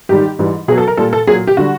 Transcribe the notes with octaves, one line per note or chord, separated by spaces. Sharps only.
G#2 D#3 G3 G4
G#2 E3 G3
B2 F#3 G#4
A4
A#4
A#2 G3 A4
A4
A#2 F#3 G#4
G4
D3 G3 F#4